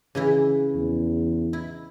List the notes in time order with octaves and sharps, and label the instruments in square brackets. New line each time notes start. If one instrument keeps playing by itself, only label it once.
[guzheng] C#3 E3 E4
[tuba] E2
[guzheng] E4